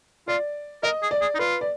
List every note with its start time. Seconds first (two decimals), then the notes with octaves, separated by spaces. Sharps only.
0.28 F4 D5
0.83 A#4 D#5
1.02 G#4
1.11 D5
1.21 G#4
1.35 D#4
1.39 F4 B4
1.61 D5